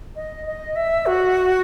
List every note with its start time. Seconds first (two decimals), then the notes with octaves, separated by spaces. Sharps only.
0.16 D#5
0.47 D#5
0.76 E5
1.06 F#4